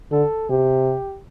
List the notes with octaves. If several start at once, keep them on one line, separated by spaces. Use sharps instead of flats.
D3 A4
C3 G4